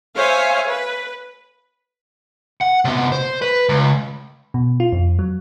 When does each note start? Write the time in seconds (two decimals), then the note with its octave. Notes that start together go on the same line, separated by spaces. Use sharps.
0.13 C5 C#5 E5 F5 G#5
0.68 B4
2.61 F#5
2.85 C3 B3
3.12 C5
3.42 B4
3.69 C#2
4.54 B2
4.80 F4
4.92 F2
5.19 F#3